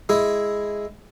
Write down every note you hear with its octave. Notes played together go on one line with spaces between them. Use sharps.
G#3 E4 G#4